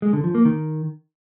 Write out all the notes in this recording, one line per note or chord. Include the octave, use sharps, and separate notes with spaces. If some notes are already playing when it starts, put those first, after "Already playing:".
G#3
D3
F3
A#3
D#3